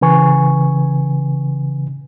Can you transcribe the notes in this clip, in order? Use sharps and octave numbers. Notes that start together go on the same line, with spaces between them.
C#3 E3 B4 G#5 C#6